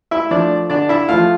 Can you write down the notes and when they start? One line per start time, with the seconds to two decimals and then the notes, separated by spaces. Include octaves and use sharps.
0.11 E4 E5
0.31 F3 A3 D4 D5
0.70 D3 D4 D5
0.89 E4 E5
1.09 F3 A3 F4 F5